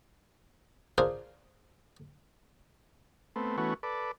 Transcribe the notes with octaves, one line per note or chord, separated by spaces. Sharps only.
D4 F4 G#4 A#4 C5
A3 B3 C4
E3 A3 B3 C#4 F#4
A4 B4 D5